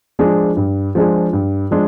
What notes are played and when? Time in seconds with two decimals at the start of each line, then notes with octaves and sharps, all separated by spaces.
0.19 F3 G#3 D4 G#4
0.57 G2
0.95 F3 G#3 D4 G#4
1.33 G2
1.71 F3 G#3 D4 G#4